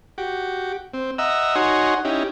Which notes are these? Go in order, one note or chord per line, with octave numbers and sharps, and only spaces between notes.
F#4 G4
C4
D#5 E5 F#5 A#5 E6
D#4 F#4 C#5 F#5 G#5 C6
C#4 D#4 E4 G4